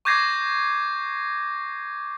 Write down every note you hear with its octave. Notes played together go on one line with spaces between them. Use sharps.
C#6 D6 G6 G#6 A#6 C7